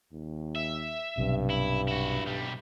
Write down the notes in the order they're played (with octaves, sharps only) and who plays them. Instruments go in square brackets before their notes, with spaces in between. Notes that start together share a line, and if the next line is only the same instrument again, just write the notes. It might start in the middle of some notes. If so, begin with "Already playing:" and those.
[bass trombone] D#2
[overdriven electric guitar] E5
[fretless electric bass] B1 C3 [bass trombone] G2
[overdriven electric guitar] E4
E4 F#4
B1 G3